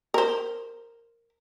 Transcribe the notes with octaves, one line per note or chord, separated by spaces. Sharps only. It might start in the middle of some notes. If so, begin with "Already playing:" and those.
A#4 C5